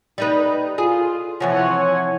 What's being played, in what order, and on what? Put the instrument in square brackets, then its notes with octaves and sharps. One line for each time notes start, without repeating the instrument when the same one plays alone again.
[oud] G3 D#4 B4
[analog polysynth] F4 [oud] G#4
[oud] C3 E3 F3 [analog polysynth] C#5 F#5 G#5